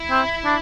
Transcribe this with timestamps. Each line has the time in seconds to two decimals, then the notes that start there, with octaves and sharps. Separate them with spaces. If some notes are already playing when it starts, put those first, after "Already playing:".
Already playing: E4
0.11 C4
0.45 D4